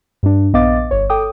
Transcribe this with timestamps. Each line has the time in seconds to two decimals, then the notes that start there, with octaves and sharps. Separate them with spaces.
0.23 G2 D4
0.53 A#1 B3 D#5 F5 D6 A6
0.91 G1 C#5
1.10 A4 G5 D6 D#6